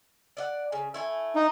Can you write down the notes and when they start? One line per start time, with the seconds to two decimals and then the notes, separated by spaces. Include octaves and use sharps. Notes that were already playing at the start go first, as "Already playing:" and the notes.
0.37 D5 D#5 F#5
0.72 C#3
0.94 A3 E4 G#5
1.35 D#4